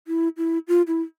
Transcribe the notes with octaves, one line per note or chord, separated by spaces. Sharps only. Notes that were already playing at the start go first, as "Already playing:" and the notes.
E4
E4
F4
E4